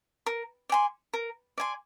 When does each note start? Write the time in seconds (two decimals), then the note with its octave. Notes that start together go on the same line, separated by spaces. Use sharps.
0.26 A#4
0.69 D5 G#5 C6
1.14 A#4
1.58 D5 G#5 C6